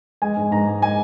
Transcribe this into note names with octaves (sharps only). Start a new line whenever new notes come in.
G#3 G#5
G#2
G#2 A#5
G#3
G#3 G#5